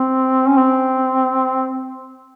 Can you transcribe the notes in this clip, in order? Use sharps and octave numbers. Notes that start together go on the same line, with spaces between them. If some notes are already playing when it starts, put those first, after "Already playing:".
Already playing: C4
C#4
C4